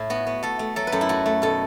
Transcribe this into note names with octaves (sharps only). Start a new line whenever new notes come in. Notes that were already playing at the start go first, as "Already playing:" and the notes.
Already playing: A2 E4
B3 F#4
B3
A3 A4
A3
F#3 A4
B4
F#2 A4
E4
A3 F#4
A3
B2 A4